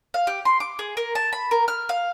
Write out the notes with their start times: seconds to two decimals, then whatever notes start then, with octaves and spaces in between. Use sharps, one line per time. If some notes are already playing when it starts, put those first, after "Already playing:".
0.14 F5
0.27 G4
0.45 C6
0.60 D6
0.79 G#4
0.97 A#4
1.15 A5
1.33 B5
1.51 A#4
1.68 F6
1.89 F5